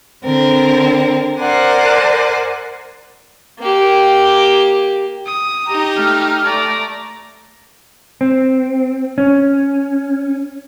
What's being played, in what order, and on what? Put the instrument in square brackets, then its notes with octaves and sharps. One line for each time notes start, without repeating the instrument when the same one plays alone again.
[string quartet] D3 C4 A#4
A#4 C5 D5 F#5 G#5
[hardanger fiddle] A#3 G4
[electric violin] D#6
[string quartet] D#4 G4 [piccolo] A#5
[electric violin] A3 [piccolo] F6
[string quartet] A3 [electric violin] D5 [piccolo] A#5
[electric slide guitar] C4
C#4